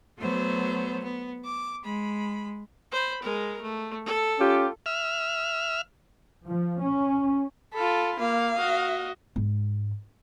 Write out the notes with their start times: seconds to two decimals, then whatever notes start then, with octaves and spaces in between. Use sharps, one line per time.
0.19 F#3 A3 B3 C5
1.03 B3
1.44 D6
1.84 G#3 B5
2.92 C5 B5
3.23 G#3 A#4
3.62 A3
4.06 A4
4.39 C#4 F4 G4
4.86 E5 F6
6.46 F3
6.83 C#4
7.73 F4 A4 B5
8.20 A#3 F5
8.56 F#4 D#5
9.36 G#2 G#3